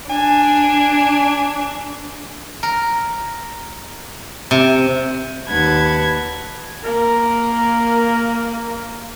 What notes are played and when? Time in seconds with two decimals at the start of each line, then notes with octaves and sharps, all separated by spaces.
0.10 D4 G#5
2.63 A#4
4.51 C3
5.48 D#2 B4 F#5 A5 G#6
6.85 A#3 A#4